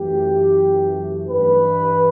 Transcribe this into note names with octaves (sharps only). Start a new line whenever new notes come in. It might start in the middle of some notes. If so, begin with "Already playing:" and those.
Already playing: F#2 E3 A3 G4
G2 E3 G3 B4